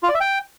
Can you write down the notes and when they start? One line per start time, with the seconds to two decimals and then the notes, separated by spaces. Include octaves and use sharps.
0.03 F4
0.09 D5
0.15 E5
0.20 G5